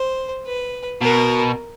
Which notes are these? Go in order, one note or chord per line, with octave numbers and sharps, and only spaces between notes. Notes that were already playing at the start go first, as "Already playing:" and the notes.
Already playing: C5
B4
B2 A#4